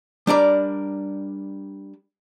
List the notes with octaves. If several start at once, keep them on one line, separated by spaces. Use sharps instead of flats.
G3 D4 A#4 D5